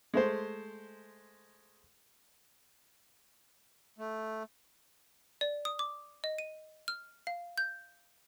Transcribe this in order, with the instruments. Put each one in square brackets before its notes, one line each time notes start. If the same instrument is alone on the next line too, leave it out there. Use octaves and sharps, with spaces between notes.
[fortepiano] G#3 A3 C5
[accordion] A3
[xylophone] D5
D#6
D6
D#5
D#7
F6
F5
G6